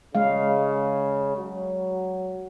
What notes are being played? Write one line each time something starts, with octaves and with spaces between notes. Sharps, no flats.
C#3 G#3 F5
F#3